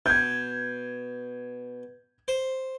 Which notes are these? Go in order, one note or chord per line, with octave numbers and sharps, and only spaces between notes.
B2 G6 G#6
C5